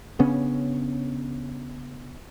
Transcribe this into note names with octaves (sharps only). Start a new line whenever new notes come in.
C#3 B3 C#4 D4